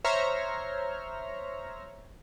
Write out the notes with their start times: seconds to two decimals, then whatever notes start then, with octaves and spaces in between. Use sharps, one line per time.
0.04 C5 C#5 E5 A#5 F6